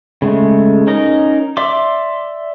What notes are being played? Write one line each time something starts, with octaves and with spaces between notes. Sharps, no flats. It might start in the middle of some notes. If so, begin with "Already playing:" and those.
C#3 G#3 A3
C#4 D#4 A#4 D#5
D5 E5 C6 D6